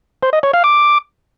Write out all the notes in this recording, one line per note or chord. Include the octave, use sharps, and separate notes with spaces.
C5
D#5
C#5
F5
D6